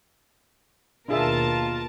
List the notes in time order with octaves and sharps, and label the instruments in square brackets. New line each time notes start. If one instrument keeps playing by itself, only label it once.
[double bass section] D#2 B2 [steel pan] D4 G#4 E5 [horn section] F4 [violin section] A#4 A5